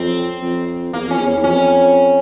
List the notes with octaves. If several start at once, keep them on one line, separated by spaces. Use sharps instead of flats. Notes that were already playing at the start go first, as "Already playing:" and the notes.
Already playing: F2 C4
F2
E2 A#3
F2
C#4
E2
E2
F2 C#4